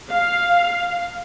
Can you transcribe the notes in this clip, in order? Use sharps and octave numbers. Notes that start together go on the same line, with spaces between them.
F5